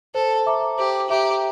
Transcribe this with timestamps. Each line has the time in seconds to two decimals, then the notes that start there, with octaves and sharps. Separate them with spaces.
0.15 A4 C5
0.46 E5 A#5 D6
0.78 G4 C5
1.10 G4 E5 A#5 D6